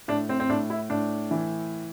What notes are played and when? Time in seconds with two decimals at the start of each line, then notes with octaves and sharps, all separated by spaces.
0.08 A2 D4
0.29 C4
0.40 C4
0.49 A2 D4
0.70 E4
0.90 A2 D4
1.31 E3